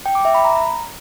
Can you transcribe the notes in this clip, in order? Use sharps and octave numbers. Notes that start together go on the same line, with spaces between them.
G5
D6
E5
B5
A#5